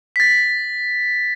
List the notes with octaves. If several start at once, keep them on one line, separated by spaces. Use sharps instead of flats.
A6 B6